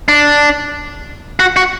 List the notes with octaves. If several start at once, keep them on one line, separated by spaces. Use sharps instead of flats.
D4
F#4
F#4